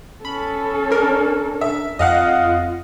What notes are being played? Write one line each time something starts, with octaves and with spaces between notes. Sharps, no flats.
C#4 A4 B5
D4 A#4
E5
F2 F4 D#5 F5 F#5